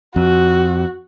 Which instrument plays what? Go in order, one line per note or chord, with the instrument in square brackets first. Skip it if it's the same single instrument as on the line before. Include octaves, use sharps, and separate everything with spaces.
[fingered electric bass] F2 [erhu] F#4